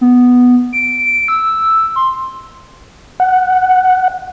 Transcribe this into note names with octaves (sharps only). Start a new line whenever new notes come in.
B3
D7
E6
C6
F#5